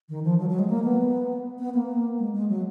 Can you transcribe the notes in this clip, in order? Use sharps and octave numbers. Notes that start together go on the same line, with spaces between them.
D#3
F3
F#3
F#3
G#3
A#3
B3
B3
A#3
G#3
G#3
F#3